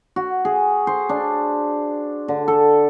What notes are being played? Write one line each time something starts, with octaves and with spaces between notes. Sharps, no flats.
F#4
G#4
C5
D4
D3
A4